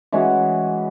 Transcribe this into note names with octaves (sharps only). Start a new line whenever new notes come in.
E3 G#3 C#4 F#4